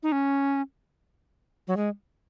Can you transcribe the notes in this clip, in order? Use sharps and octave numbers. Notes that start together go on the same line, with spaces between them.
D#4
C#4
F#3
G#3